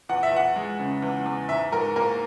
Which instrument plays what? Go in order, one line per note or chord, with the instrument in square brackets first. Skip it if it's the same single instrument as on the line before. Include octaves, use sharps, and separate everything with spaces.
[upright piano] E2 F#5
E5
E2 F#5
G#3
C#3
E2
E2
G#2 E5
G#2 A#4
A#3 A#4